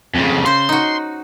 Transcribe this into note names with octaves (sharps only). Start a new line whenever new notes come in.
F2 C#3
C#3 C5 C6
D#4 F#4